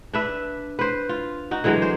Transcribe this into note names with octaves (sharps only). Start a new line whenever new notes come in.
D4 B4 E5
B4 C5
F4
D#4 F#4
D3 E3 F#3 G#3
C5